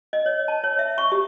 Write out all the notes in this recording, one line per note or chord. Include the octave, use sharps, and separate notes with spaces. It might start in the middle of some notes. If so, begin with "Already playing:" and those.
D#5
C#5
A5
C#5
E5
C#6
G4